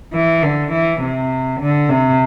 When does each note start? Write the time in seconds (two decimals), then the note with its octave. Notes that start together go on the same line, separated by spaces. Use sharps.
0.14 E3
0.43 D3
0.72 E3
1.01 C3
1.61 D3
1.89 C3